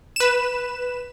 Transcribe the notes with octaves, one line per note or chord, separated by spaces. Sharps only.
B4 E7